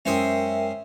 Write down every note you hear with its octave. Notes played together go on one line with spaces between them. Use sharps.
F#2 G#3 C#4 A#4 C5 E5 G5 D#6